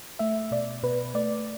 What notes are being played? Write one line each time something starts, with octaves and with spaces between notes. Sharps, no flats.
A3 E5
B2 D5
B2 B4
A3 D5